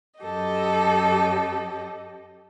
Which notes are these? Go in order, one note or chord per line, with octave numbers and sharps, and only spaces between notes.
F#2 G4 A4 D#5